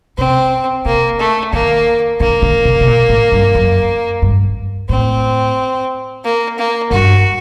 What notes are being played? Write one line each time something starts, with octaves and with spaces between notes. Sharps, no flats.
C3 C4
C3 A#3
A3
D#3 A#3
D3 A#3
D3
C3
C3
A#2
A2
G2
F#2
G2
A2 C4
A#3
A#3
G2 F#4